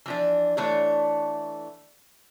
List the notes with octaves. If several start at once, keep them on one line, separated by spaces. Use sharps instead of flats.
E3 F3 D4
E3 A3 D4 C#5